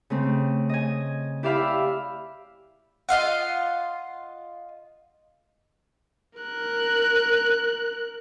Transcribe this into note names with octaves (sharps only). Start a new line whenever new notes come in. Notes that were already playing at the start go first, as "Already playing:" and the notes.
C#3 A3 C4
D#5 G#5
E4 G4 D5 E5 F5 B5
F4 D#5 F5 F#5
A#4 F#6